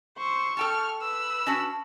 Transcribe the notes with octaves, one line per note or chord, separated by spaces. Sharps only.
C5 C#6 E6
A4 G5 A5 F6
B4 E6
C#4 D4 F#4